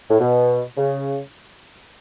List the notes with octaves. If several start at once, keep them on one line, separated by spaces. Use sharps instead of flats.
A2
B2
C#3